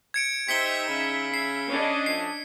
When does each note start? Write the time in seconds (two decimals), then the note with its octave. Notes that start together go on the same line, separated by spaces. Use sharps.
0.14 G#6 C#7 D7
0.49 D#4 G4 C5 E5 B6 C#7 G7
0.88 C#3 B5
1.34 E5 C7
1.70 C#4 D4 D#5
2.06 F3 A3 C7